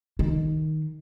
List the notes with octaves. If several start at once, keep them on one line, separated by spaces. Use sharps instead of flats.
D#3